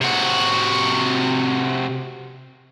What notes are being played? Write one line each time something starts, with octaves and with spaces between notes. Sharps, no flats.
C3 F#4